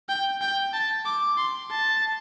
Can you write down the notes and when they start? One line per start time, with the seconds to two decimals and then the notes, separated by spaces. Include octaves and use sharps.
0.09 G5
0.41 G5
0.73 A5
1.05 D6
1.37 C6
1.71 A5